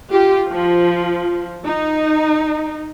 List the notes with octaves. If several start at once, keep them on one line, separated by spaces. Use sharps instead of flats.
F4 G4
F3
D#4